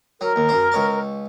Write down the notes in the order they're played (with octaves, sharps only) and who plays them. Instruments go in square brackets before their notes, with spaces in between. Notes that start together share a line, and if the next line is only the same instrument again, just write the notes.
[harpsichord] F#3 [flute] A#4
[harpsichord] D#2
F#2 C5
C#2 C#5 A5